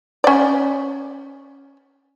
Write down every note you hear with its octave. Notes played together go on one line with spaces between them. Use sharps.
C#4 D5